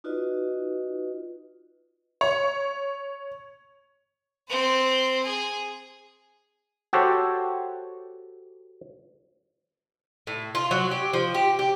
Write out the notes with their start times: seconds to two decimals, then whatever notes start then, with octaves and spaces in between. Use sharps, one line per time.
0.04 D#4 F4 F#4 B4 D5 D#5
2.21 C#5
4.49 C4 C5
5.23 G#4
6.93 F#4 G4 A4 C5 C#5
10.27 A2
10.55 F4
10.71 F#3
10.91 G4
11.13 F3
11.34 G4
11.59 G4